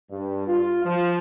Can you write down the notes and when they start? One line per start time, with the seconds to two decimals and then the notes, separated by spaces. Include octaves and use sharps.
0.11 G2
0.47 F4
0.85 F3